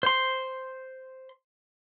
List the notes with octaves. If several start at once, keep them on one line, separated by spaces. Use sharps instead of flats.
C5 C6